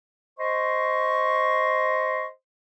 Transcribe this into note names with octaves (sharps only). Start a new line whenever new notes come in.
C5 D#5 C6 C#6